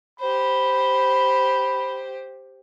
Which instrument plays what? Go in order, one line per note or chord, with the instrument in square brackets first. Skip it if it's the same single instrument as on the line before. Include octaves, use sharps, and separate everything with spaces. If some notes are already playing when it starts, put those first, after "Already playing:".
[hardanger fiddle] G4 C5 [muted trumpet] B5